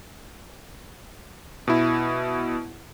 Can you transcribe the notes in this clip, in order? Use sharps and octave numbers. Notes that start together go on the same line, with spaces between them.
B2 E4